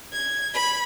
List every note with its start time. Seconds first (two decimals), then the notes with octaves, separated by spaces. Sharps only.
0.12 G#6
0.54 B5